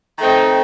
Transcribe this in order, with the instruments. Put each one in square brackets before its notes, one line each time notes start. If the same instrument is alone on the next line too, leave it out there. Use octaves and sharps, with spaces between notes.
[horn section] D#3 A3 C4 D#4